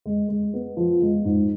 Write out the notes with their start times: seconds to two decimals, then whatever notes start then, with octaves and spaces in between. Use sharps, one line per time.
0.05 G#3
0.29 G#3
0.54 B3
0.77 F3
1.02 G#3
1.25 G#2